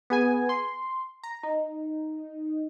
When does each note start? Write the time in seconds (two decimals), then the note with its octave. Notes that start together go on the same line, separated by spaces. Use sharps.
0.10 B3 G#4 G#5
0.49 C6
1.23 A#5
1.43 D#4